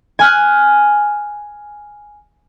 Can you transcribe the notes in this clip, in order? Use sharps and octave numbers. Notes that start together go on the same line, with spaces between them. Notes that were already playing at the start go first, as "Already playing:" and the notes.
G#5 F6 F#6